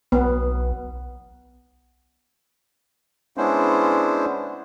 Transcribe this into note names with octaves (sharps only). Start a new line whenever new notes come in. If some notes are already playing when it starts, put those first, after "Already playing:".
B1 B3
G#3 B3 C#4 D4 E4 C5